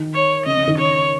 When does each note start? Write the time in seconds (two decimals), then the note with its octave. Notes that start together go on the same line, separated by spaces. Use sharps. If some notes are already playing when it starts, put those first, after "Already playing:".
Already playing: D#3
0.14 C#5
0.46 C#3 D#5
0.57 C#3
0.67 D#3
0.79 C#5